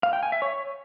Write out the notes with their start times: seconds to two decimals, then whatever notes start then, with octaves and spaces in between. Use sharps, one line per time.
0.03 F5
0.13 G5
0.23 G#5
0.32 E5
0.42 C#5